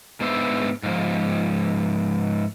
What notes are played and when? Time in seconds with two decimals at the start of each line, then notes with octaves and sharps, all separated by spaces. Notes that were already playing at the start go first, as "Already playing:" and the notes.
0.21 G#2 B3 D4 C5 E5
0.83 G#2 F3